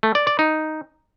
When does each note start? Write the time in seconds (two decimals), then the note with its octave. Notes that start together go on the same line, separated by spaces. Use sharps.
0.03 A3
0.15 D5
0.27 D5
0.39 D#4